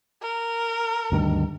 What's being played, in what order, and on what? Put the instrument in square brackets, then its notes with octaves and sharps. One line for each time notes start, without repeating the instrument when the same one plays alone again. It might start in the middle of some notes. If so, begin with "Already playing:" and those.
[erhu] A#4
[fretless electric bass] D2 G2 D#3